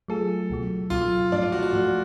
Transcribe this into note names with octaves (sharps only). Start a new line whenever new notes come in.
F#3 A3 F4 G#4 A4
C#2 B2 F#3
C#2 B2 F#3 F4
G#2 F3 A3 D4
F4
F#4
F#4
G#2 F3 A3